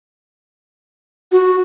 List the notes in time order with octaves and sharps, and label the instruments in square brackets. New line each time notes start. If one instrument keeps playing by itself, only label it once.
[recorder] F#4